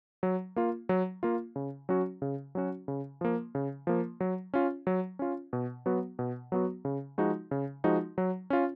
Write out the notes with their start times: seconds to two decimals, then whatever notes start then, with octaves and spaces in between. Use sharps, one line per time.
0.23 F#3
0.56 A#3 F4
0.89 F#3
1.23 A#3 F4
1.56 C#3
1.89 F#3 C#4 F#4
2.22 C#3
2.55 F#3 C#4 F#4
2.88 C#3
3.21 F3 A#3
3.55 C#3
3.87 F3 A#3
4.20 F#3
4.54 C#4 F4
4.87 F#3
5.19 C#4 F4
5.53 B2
5.86 F#3 B3 F#4
6.19 B2
6.52 F#3 B3 F#4
6.85 C#3
7.18 F3 G#3 D#4 F#4
7.51 C#3
7.84 F3 G#3 D#4 F#4
8.18 F#3
8.50 C#4 F4